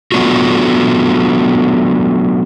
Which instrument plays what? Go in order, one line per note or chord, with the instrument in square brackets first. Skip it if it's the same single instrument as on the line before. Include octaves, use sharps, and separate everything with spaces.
[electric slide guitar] F#3 A3 B3 D4 F4 F#4